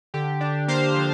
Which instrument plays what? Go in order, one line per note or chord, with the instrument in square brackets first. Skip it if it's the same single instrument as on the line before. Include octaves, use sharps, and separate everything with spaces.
[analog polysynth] D3 G4
D4
A#3 C5 F5
F3